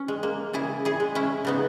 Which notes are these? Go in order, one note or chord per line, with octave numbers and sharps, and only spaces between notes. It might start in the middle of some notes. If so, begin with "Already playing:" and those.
Already playing: C#4
G#3
A#3
C#3 E4 G#4
E4 G#4
G#3
C#4 E4
C#3 B3 D#4